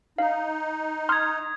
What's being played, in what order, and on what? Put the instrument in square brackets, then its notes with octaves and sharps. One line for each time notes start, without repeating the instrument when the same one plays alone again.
[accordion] D#4 [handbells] F5
[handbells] C6 F6 [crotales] D#6 G#6